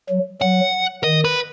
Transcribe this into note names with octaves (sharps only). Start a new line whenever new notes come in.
F#3
F#3 F#5
D#3 D#5
B4